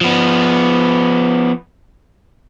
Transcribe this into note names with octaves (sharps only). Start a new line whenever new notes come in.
F3 B3